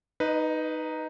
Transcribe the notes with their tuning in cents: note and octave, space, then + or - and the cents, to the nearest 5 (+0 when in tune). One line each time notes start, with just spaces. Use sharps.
D#4 +0 B4 +0 D#5 -40